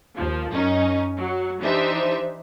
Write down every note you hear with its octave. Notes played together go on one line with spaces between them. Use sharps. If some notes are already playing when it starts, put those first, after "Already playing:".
D#2 F3
F#2 C#4 D#4
F#3
E3 D4 D#4 G4 C5 E5